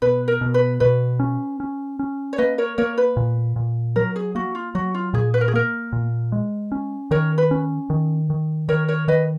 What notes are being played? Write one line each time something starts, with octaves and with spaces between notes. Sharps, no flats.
B2 B4
A#4
B2
B4
B2 B4
C#4
C#4
C#4
C#5
A#3 B4 D#5
A#4 C#5
A#3 A#4 C#5
B4
A#2
A#2
F#3 A#4
G#4
A#3 F#4
F4
F#3 F#4
F4
A#2 G#4
B4
A#4
G#4
A#3 A#4
A#2
G#3
C#4
D#3 A#4 C#5
B4
C#4
D#3
D#3
D#3 A#4 C#5
A#4 C#5
D#3 B4 D#5